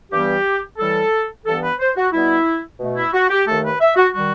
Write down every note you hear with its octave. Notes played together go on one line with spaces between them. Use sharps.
G2 E3 G3 B3 G4
A2 E3 G3 A4
G2 E3 B3 A4
B4
C5
F#4
B2 G3 B3 E4
B2 A3
E4
F#4
G4
D#2 D#3 A3 A4
B4
E5
F#4
D#3 G3 F#4